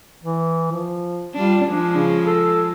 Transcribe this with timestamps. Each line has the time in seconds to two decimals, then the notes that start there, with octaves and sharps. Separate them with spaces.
0.24 E3
0.72 F3
1.34 G3 D4 F4
1.66 F3 G#3 D4
1.96 C#3
2.26 A4